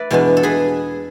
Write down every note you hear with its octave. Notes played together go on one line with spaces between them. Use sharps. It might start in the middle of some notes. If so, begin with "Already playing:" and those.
Already playing: B4 D5 E5
E2 B2 G#3 B3 D4
A4
G#4 B4